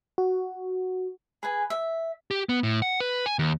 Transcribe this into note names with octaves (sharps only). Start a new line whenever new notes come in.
F#4
G#4 B4 G#5
E5
G4
B3
A2
F#5
B4
G#5
D#2